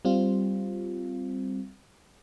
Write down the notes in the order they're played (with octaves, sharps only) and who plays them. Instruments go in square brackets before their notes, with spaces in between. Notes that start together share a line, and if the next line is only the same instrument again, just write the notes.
[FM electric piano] G3 C4 F4